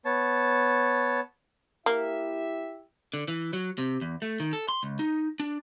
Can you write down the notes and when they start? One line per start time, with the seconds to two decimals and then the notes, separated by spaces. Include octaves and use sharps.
0.05 B3 C#5 A5
1.86 A#3 E4 G4 E5
3.14 D3
3.28 E3
3.53 F#3
3.78 C3
4.01 E2
4.22 A3
4.40 D#3
4.53 A4
4.69 C6
4.83 C#2
4.99 D#4
5.40 D4